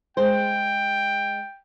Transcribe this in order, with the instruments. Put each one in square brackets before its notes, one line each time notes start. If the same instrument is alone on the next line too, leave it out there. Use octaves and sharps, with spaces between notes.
[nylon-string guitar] G#3 C5 [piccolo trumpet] G5